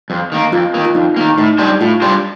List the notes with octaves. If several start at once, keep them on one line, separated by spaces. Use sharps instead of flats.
F2
D#3 A#3
F2 F4
D#3 A#3
F4
F2 D#4
D#3 A#3
A2 D#4
G3 D4 G4 C5
A2 F4
G3 D4 G4 C5